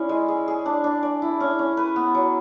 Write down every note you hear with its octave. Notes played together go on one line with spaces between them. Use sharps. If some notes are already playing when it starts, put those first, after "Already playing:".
Already playing: C#4 E4 G#4 D5
G#3
G#4
G#4
D4
D4
D5
E4
C#4
C#4
B4
B3
F#3